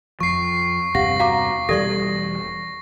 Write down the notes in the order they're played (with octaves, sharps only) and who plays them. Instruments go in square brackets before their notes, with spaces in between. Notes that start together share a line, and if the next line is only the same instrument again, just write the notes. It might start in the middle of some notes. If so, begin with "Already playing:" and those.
[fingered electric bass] F2 F3 [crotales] C#6 C7
[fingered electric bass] E2 G2 C3 [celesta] G4 F5 F#5 [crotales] A#6
[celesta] F#4 A#5 D6 [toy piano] F5
[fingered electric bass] E1 E3 G3 [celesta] G4 C#6 [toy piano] A4 D5 [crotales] A#6